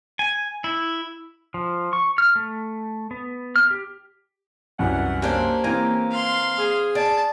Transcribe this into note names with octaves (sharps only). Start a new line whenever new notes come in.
G#5
E4
F3
C#6
F6
A3
B3
F6
G4
C2 F#2 E3 B3 C#5 F#5
A#3 C#4 D4 G4 C5
E3 A#3 C4 G#5 A#5
F5 C6
G#4
D5 A5